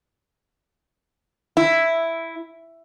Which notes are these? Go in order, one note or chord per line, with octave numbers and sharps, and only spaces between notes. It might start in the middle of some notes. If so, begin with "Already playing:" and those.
E4